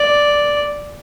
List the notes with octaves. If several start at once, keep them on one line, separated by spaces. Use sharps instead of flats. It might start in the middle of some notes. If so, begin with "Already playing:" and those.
Already playing: D5